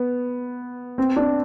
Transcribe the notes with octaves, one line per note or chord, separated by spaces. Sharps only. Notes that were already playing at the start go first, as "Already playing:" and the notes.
Already playing: B3
C4
D4